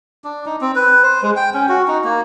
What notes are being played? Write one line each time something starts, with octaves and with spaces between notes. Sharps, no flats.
D4
D#4
C4
B4
C5
G#3
G5
C#4
F#4
D#4
A#3